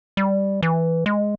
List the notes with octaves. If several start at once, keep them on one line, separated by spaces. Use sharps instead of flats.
G3
E3
G#3